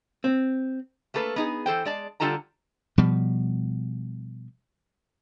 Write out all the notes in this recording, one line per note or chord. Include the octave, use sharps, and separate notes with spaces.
C4
A3 A#3 A4 B4
B3 D#4 G#4
E3 A4 C5 G5
G#3 D5 A5
D3 G3 F4 A4 A5 A#5
B2 F3 G3